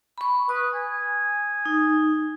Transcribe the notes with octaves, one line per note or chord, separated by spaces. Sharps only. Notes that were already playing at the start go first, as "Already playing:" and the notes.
B5 C#6
B4 D#6
G#5
D#4